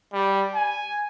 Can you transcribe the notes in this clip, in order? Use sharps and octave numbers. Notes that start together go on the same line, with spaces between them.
G3
G#5